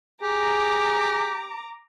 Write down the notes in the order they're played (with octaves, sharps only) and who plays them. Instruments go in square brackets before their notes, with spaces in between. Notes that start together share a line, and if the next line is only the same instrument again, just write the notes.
[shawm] G4 [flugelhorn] G#4 [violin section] A#5 D6